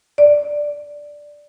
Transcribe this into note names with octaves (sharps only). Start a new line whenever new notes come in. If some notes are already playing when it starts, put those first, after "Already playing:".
D5